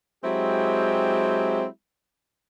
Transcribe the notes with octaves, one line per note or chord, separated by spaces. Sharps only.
F#3 G#3 C4 E4 G4